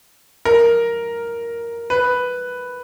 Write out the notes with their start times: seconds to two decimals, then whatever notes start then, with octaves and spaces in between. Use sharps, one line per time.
0.45 A#4
1.90 B4